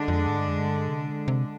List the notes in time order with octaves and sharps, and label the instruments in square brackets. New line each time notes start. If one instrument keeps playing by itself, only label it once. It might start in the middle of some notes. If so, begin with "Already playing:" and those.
Already playing: [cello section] D3 G#3 D4
[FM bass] F2
G#2
G2
F2
G2
C3
C3